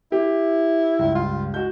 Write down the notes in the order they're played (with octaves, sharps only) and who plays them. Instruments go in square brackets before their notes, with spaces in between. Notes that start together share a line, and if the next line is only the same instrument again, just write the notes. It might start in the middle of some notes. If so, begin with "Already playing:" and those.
[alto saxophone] E4 [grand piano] G4
[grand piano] C#2 G2
[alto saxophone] F4
[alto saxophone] G#3 [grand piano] F#4 G6